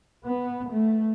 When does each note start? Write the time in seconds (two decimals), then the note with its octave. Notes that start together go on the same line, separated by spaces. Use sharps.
0.24 B3
0.70 A3